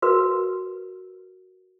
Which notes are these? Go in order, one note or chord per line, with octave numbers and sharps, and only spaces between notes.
F#4 A#4 B4